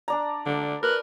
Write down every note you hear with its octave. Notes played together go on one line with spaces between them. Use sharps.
D4 D5 A#5
D3
A#4 B4